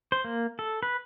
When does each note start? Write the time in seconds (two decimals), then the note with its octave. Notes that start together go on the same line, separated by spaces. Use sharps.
0.12 C5
0.24 A#3
0.59 A4
0.83 B4